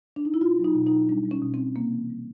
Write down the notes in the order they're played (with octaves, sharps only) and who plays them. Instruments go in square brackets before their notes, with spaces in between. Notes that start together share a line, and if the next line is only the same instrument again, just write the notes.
[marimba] D4
D#4
E4
B2 F4
F#3
D#4
B2
D#4
F#3
G3 D4
G3
C#4
B2
C4
B2
C3 A#3
E3
G3